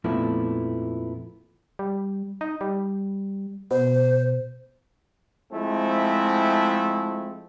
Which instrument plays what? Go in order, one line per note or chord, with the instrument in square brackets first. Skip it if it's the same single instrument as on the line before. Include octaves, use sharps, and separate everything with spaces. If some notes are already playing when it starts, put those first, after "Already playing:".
[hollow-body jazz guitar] F2 A#2 F3 A3 B3 E4
[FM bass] G3
D#4
G3
[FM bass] B2 [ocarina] C5
[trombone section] F3 G#3 A3 C4 E4